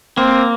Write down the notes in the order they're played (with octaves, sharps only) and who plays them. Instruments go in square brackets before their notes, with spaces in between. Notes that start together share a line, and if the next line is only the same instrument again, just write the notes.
[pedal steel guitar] A#3 [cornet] C4